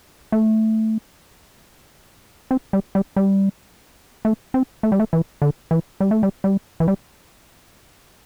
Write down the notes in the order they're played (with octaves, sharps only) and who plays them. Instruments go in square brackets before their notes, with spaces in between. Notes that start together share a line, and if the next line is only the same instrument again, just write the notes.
[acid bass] A3
C4
G3
G3
G3
A3
C4
A3
G3
A3
E3
D3
E3
G3
A3
G3
G3
E3
G3